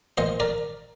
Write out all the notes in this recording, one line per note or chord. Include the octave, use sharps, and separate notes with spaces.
A#2 C5 D#5
A#4 D5